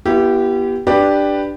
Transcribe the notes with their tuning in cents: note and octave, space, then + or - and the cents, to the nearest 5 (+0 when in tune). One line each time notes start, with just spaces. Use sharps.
B3 -30 E4 +35 G4 -10
D4 +5 G4 +0 B4 +0